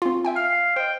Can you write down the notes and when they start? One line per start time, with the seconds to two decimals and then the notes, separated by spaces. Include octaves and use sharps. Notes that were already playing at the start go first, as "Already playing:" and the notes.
0.02 C4 F4
0.25 E5 G5 G#5
0.36 F5 F6
0.76 C5 D#5 G5